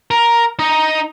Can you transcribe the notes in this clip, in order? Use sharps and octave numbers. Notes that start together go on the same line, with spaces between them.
A#4
D#4 D#5